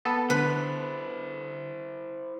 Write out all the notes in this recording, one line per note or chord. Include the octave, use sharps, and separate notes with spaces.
B3 A4
D3 E4 B4 C5